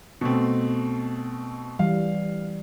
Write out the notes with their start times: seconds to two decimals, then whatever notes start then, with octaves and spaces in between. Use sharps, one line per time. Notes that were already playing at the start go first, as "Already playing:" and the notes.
0.21 B2 A3 C4
1.79 E3 G3 F5